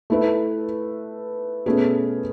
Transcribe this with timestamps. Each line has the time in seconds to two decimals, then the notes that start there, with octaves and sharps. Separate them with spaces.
0.10 A3 E4 B4
1.66 B2 A3 C#4 G#4 B4